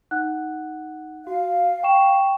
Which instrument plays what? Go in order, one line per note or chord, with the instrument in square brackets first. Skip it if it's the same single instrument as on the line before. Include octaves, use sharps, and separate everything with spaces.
[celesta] D#4 F#5 F#6
[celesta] F#4 [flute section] F5
[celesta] G5 C#6 E7